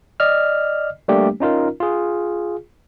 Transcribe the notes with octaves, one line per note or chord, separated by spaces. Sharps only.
D5 D#5 F6
G3 A3 A#3 D4 G4
C#4 D#4 F4 A#4
F4 G#4